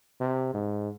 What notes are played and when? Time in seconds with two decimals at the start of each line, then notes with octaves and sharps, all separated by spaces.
0.21 C3
0.54 G#2